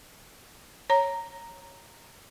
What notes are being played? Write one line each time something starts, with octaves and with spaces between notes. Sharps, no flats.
C#5 A#5